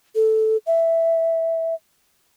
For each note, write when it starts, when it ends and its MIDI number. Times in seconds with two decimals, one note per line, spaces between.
0.15 0.57 69
0.66 1.74 76